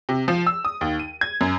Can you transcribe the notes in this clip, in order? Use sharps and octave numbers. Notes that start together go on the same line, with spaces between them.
C3
F3
E6
D#6
D#2
D#7
G#6
F#2